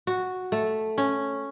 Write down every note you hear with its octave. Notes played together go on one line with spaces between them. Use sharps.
F#4
A3
C#4